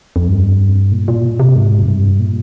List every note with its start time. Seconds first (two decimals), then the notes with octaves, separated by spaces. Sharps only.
0.16 F2
0.28 G2
0.92 A#2
1.08 A#2
1.40 C3
1.56 G#2
1.82 F2
1.88 G2
2.19 A#2